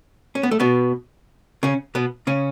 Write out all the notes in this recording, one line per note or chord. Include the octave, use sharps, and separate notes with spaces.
C#4
B3
A3
B2 B3
C#3 C#4
B2 B3
C#3 C#4